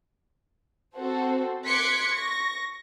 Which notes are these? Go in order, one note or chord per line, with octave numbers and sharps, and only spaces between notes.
C4 F#4 A4 C5
C6 D6 F#6 G#6 B6 C#7
C#6 A#6